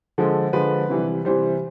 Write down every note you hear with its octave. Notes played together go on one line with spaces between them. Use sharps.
D3 F3 G#3 A4
D3 F3 G#3 B4
C3 E3 G3
C3 E3 G3 C5